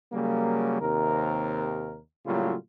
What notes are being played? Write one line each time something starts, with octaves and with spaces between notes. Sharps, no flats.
C#3 F#3 G3 A#3
D#2 C3 A#4
A2 C#3 F#3 G3 A#3 F4